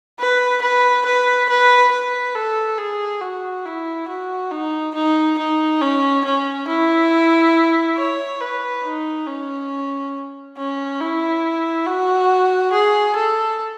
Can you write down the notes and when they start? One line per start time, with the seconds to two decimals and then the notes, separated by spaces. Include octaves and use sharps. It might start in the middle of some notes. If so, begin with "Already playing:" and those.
0.20 B4
0.62 B4
1.06 B4
1.50 B4
1.92 B4
2.35 A4
2.78 G#4
3.21 F#4
3.66 E4
4.09 F#4
4.51 D#4
4.95 D#4
5.39 D#4
5.81 C#4
6.25 C#4
6.68 E4
7.98 C#5
8.40 B4
8.84 D#4
9.27 C#4
10.58 C#4
11.00 E4
11.87 F#4
12.73 G#4
13.17 A4